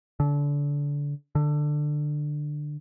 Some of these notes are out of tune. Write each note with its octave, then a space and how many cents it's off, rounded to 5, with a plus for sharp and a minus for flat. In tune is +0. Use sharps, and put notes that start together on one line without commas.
D3 -30
D3 +15